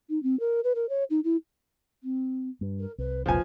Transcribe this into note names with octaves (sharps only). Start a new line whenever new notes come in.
D#4
C4
A#4
B4
A#4
C#5
D#4
E4
C4
G2
A#4
C2 B4
F1 C2 A#2 F3 B4 G#5